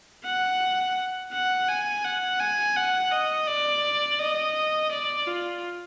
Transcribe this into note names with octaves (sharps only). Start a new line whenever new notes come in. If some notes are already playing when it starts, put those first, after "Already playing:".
F#5
F#5
G#5
F#5
G#5
F#5
D#5
D5
D#5
D5
F4